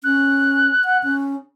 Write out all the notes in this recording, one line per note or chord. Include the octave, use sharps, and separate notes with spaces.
C#4 F#6
F#5
C#4